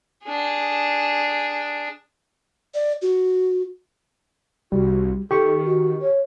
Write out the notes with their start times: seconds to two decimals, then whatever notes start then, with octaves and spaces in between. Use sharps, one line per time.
0.25 D4 G#4
2.74 D5
3.02 F#4
4.72 C2 G3 F#4
5.31 D#3 G4 A4 C#6
5.65 F#4
6.01 C#5